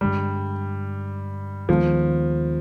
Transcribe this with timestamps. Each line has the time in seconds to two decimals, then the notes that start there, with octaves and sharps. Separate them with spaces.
0.01 G2 D3 G3 G#3
1.69 D#2 D#3 F3 G#3 B3